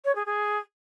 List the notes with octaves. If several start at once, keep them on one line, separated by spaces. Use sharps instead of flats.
C#5
G#4
G#4